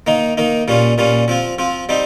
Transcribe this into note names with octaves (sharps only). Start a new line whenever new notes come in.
D#3 A#3 D#4
D#3 A#3 D#4
A#2 G3 C#4 F4
A#2 G3 C#4 F4
F3 C4 F4
F3 C4 F4
G3 C4 D#4 G4